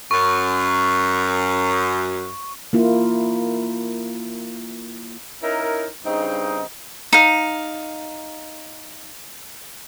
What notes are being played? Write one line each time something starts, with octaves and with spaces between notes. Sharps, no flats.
F#2 C#6
A#3 E4 F4
C#4 D#4 E4 A#4
G2 C#3 C4 D#4
D#4 F5